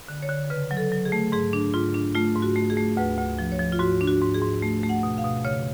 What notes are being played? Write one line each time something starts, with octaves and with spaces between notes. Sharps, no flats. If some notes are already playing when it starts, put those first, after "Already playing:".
D3
C#5
D3
C#3 B4
F#3
A4
F#3
G#4
A3
G#2 G#4
D4
G#2 F4
D4
A3 F4
G#2
F#4
A3
G#4
A3
D2 B4
D2
F3
C#5
F3
F4
G#2 F#4
D4
F#4
G#2
G#4
G#2
A3
A3
F#5
B2
F5
B2
C#3 C#5